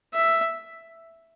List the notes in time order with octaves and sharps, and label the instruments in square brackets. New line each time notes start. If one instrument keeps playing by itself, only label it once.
[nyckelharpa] E5